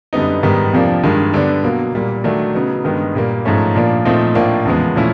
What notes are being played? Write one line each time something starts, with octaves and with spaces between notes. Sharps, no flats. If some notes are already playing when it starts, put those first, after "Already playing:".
F#2 D3 G3 B3 D#4
G#2 D#3 G3 B3
F2 C3 F3 A#3 D4
G2 D#3 G#3
D3 G3 B3 D4
B2 F#3 A#3
A#2 G3 A#3
D#3 F#3 A3 D4
C#3 F#3 B3 D#4
G2 D#3 G#3 B3 D#4
A#2 G3 A#3
G#2 F3 A3 C#4
A#2 F3 A#3 D4
A#2 F3 A3 C4 D#4
A2 F3 A#3 D4
E2 C#3 F3 G#3 B3
A#2 F3 A3 C#4 E4